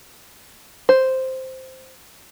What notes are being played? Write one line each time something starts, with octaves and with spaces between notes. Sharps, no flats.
C5